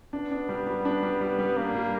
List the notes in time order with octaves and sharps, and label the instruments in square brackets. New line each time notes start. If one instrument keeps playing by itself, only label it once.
[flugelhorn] B3 [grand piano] D4
[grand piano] D4
G3
G3
D4
G3
G3
G3
[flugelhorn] A#3 [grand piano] D4
[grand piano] G3